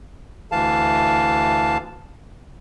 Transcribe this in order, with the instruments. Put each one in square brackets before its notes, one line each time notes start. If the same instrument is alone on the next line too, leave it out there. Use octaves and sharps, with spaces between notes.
[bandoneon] D2 E3 F5 A5